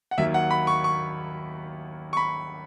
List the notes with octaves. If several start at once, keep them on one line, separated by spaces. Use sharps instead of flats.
F#5
D#2 D#3 F#3 A#3 E5
F#5
B5
C#6
C#6
C#6
B5